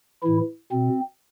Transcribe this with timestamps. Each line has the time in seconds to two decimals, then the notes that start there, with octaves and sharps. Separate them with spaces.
0.22 A2 E3 E4
0.72 B2 C4